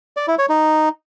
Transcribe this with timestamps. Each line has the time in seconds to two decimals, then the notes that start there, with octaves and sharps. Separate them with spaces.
0.17 D5
0.28 E4
0.39 C#5
0.49 D#4